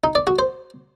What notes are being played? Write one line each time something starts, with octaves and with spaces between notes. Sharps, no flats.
D#4
D5
F#4
C5